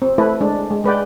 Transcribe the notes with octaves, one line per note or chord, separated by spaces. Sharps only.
C4
A3 E4 A4 B4
G#3 D4
G#3
G#3 B4 D5 G5